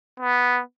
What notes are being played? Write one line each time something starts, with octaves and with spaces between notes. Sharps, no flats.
B3